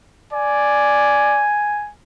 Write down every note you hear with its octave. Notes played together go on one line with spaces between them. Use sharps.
D5 G#5